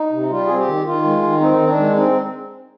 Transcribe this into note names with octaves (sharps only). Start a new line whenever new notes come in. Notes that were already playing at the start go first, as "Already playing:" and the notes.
Already playing: D#4
C3
G3 F4
C4 G#4
G4
D#3
D#3 F4
G#3
D#3
C4 D#4
D#3
D4
G#3
C4 D#4